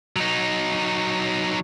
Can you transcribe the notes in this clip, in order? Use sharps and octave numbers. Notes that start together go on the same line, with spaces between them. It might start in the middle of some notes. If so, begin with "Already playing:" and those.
F#3 D#4